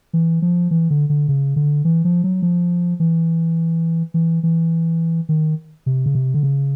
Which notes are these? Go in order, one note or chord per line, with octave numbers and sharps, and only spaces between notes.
E3
F3
E3
D3
D3
C#3
D3
E3
F3
F#3
F3
E3
E3
E3
D#3
C3
C#3
C3
D3
C#3